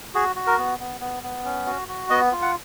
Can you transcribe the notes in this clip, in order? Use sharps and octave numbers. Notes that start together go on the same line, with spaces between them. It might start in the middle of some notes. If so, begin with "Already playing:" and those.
F#4 G#4
F#4
A#4
B3
B3
B3
B3
C#4
F#4
F#4
B3 D#5
F4
F#5